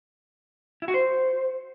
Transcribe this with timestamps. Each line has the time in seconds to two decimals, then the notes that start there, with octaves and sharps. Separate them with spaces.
0.82 E4
0.88 F#4
0.94 C5